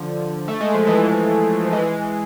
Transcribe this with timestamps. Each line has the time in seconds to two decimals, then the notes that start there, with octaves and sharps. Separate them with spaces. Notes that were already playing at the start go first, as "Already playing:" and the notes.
Already playing: D3 F3
0.48 A3
0.60 G#3
0.74 F3
0.87 E3 G#3
1.65 F3
1.72 E3 G#3